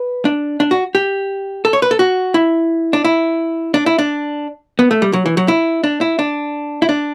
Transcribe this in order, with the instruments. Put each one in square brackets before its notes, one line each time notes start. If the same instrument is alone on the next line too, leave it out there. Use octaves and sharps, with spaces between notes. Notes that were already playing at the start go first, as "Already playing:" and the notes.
Already playing: [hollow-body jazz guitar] B4
D4
D4
F#4
G4
A4
C#5
B4
A4
F#4
E4
D4
E4
D4
E4
D4
B3
A3
G3
F#3
E3
F#3
E4
D4
E4
D4
E4
D4